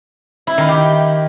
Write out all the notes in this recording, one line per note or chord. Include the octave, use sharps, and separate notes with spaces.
E4
D#3
G4